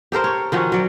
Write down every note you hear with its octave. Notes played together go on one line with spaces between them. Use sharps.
G4 A4 A#4 C5
C#5
D#3 F3 C#4 F#4
F#3 D5